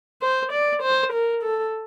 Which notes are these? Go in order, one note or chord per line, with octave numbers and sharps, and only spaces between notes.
C5
D5
C5
A#4
A4